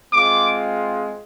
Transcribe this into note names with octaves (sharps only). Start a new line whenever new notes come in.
G#3 C4 F4 D6